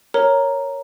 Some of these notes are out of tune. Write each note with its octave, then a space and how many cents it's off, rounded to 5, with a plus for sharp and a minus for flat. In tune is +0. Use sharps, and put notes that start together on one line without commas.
A#4 +0 C#5 +0 A#5 +0